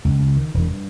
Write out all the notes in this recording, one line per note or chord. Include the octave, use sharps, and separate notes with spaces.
C#2
C#2
D#3
E1
G2